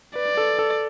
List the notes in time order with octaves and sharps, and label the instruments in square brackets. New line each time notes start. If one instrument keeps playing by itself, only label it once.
[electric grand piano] B4 [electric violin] D5
[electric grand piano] A4
A4